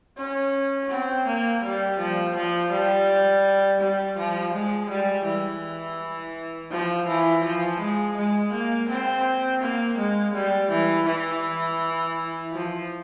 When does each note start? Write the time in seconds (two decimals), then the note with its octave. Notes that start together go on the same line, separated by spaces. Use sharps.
0.18 C#4
0.90 C4
1.26 A#3
1.64 G3
1.99 F3
2.36 F3
2.71 G3
3.81 G3
4.18 F3
4.54 G#3
4.90 G3
5.25 E3
6.71 F3
7.07 E3
7.44 F3
7.80 G#3
8.17 G#3
8.53 A#3
8.89 C4
9.62 A#3
9.98 G#3
10.34 G3
10.70 E3
11.06 E3
12.53 F3